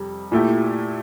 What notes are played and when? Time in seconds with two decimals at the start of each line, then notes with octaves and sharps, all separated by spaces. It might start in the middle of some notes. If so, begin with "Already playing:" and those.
Already playing: F2 C3 G3
0.32 A#2 A3 E4 G4